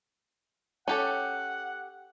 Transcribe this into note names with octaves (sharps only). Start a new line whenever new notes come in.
C#4 G4 A4 F#5